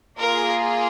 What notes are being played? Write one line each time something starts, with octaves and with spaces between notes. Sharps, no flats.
A#3 F4 G#4 A#4